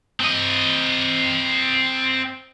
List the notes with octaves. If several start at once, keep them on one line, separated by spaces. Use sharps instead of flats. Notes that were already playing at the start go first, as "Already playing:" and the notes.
C4 D#5